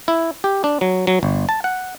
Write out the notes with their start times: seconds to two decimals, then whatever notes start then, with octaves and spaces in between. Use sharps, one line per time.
0.08 E4
0.44 G4
0.64 D4
0.81 F#3
1.07 F#3
1.23 G1
1.49 A5
1.64 F#5